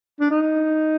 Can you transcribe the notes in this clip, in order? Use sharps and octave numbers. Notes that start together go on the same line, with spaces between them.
D4
D#4